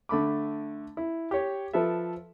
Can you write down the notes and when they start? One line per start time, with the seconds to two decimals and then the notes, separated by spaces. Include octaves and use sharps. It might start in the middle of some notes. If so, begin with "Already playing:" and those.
0.09 D3 A3 B5 D6
0.97 E4
1.31 G4 C#5
1.73 F3 A4 B4 E5